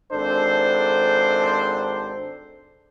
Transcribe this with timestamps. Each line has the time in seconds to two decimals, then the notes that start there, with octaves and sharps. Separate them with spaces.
0.11 G#1 D4 A4 C5